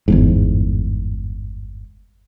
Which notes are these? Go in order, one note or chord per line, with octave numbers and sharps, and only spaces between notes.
G1 E2 G#2